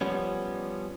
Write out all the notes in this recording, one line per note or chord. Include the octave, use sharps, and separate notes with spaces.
F3 G3 B3 C#4